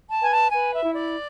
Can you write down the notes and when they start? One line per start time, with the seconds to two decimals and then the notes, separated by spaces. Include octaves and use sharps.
0.10 A5
0.21 B4 G#5
0.31 A5
0.51 B4 G#5
0.73 E5
0.83 E4
0.94 D5